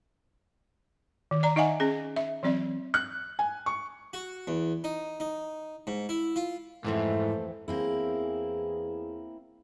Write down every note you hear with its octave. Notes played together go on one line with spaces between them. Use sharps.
D#3
D5 A#5
D#4 D#5 E5 F#5 G#5
C#4 G#4
E5
E3 F#3 C4 D5
F#6
G#5
C#6
F#4
E2
D#4
D#4
G#2
E4
F4
F2 G#2 E3 A3 C4 E4
E2 A#3 C4 E4 G#4